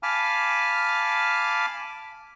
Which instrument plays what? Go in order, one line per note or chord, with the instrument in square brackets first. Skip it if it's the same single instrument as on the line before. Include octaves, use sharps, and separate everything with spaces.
[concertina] F5 G#5 A5 B5 D6 F6